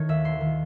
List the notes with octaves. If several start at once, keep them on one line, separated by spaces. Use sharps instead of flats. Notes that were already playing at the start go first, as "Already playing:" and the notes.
Already playing: D#3 A3 C#5
D#2 E5
E1 C6
D#3